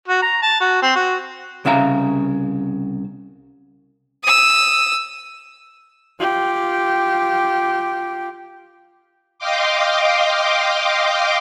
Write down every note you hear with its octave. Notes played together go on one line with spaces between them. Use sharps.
F#4
A#5
A5
F#4
C4
F#4
C2 C#3 E5 F5 A#5
D#6 E6
F4 G4
D#5 F5 G5 C6 D6